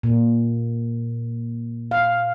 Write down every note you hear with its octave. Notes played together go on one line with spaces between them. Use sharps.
A#2
F5